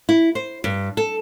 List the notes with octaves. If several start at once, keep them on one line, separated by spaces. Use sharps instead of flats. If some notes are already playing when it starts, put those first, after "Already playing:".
E4
C5
G2
A4